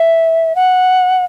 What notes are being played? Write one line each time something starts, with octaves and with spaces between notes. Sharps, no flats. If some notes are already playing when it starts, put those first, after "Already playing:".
Already playing: E5
F#5